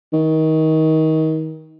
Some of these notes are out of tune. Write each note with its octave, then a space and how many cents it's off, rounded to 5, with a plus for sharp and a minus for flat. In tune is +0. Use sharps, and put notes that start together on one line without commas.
D#3 +25